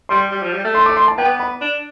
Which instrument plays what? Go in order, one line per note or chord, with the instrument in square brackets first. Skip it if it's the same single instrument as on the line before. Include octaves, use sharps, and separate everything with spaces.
[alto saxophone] G3 [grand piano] C6
[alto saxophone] G3
F3
G3
A3
[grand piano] C6
D6
C6
A5
[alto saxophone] B3 [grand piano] G5
[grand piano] B5
[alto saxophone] D4